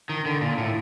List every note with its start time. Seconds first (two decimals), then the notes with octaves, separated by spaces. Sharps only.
0.09 D#3
0.26 D3
0.41 A#2
0.58 A2